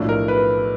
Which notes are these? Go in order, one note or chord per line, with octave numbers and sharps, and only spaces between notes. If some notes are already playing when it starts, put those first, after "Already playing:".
Already playing: B1 A2 F3 A3 D4
A#4
B4